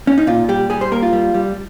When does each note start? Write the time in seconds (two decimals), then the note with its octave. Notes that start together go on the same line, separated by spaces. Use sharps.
0.07 C#4
0.18 D#4
0.27 A#2 F4
0.49 G3 G4
0.70 G3 G#4
0.81 C5
0.91 A#3 A#4
1.02 F4
1.13 G3
1.34 G3